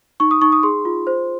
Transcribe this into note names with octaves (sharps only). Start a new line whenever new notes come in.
D#4 C#6
D#6
D#4 C#6
D#6
G#4 C6
F4
C5